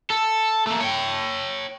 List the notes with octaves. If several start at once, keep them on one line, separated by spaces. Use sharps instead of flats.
A4
A3 A#3
C#5 G5